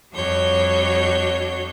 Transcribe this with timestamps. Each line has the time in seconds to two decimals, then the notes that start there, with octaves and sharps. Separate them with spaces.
0.12 F2 G3 D4 F#4 C#5 G6